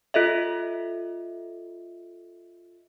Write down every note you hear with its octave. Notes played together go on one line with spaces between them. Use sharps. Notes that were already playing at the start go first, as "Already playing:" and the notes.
F4 A4 D#5 E5